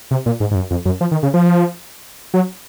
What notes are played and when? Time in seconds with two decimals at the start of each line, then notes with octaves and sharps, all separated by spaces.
0.11 C3
0.26 A#2
0.40 G#2
0.51 G#2
0.55 F#2
0.71 F2
0.85 F#2
1.01 F3
1.11 D#3
1.23 C#3
1.34 F3
2.34 F#3